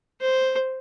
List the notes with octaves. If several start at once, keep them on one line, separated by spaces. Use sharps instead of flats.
C5